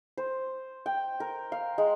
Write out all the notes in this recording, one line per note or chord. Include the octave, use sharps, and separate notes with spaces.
C5
G5
A#4
F5
G#3